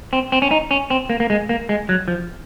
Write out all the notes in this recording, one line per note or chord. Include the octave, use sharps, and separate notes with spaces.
C4
C4
C#4
D#4
C#4
C4
A#3
A#3
G#3
A#3
G#3
F#3
F3